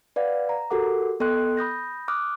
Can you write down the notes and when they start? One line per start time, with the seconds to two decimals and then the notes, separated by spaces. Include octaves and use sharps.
0.16 B4 D5 F5 F#5 G#6
0.49 A#5
0.70 F#4 G4 A4 A#4 F#5 D6
1.20 B3 A4 D#5 G5 C6 F#6
1.57 B5 D#6 G6 A#6
2.08 D6 D#6 F6 F#6